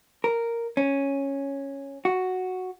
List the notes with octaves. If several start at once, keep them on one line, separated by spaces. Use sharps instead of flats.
A#4
C#4
F#4